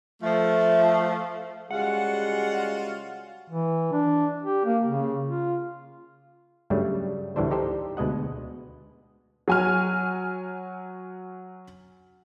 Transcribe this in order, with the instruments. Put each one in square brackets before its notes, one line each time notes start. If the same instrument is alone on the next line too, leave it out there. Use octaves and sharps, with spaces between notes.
[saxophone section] F3 A3
[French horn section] C#3 G3 G#3 [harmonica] F4 F#4 F5 [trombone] G#4 [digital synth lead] F#5
[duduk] E3
D4
G4
A#3
C#3
F4
[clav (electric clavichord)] G2 C#3 F#3 G3 A3 D4
D2 A2 E3 G3 D4 C5
D#4 G4 A4 C5
D2 B2 G#3 D#5 F#5
[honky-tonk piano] F#3 G#5 F6